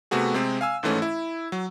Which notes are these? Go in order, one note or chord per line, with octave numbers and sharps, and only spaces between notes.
C3 A3 B3 F#4 G#4
C3 G#3 C4
F5 G#5 E6
G#1 G#2 E3 A3 C#4
E4
F#3